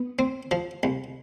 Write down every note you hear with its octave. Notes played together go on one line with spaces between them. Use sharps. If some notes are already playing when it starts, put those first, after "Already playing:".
Already playing: B3
C4
F3
C2